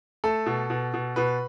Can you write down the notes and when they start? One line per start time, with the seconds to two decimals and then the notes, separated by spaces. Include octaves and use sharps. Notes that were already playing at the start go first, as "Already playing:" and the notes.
0.24 A3 A4
0.46 B2
0.70 B2
0.94 B2
1.16 B2 B4